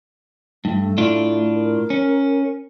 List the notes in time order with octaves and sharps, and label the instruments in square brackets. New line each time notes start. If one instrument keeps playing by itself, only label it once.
[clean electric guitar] G2 [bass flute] A3
[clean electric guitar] A2 D4 F4
[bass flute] A#4
[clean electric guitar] C#4